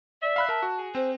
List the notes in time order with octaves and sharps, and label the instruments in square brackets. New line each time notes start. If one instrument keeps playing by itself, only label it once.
[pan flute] D5 [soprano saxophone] E5
[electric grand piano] F5 B5 F#6
[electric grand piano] A#4 [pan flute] A5
[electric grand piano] F#4
[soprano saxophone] G#4
[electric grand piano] C4 [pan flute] C5